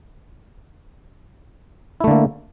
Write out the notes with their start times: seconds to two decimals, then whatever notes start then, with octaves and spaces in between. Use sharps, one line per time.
2.00 E4
2.04 A3
2.08 D3
2.11 A#3